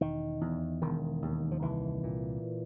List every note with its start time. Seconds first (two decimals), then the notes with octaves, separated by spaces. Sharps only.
0.01 E1 D#3
0.41 E2
0.82 E1 D#3
1.22 D#2
1.51 F3
1.62 C2 E3
2.03 A#2